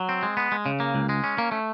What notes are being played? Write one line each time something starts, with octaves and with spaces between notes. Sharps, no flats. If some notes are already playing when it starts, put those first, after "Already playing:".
Already playing: F#3
C4
G#3
B3
G#3
C#3
A#3
C#2
G#3
C#4
A#3
A3